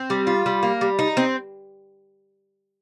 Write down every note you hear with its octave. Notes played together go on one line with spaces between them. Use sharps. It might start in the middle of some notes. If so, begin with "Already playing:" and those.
Already playing: C4
G3
F4
G3
A#3
G3
D#4
C4